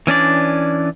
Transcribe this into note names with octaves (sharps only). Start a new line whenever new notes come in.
E3 C#4 D4 D5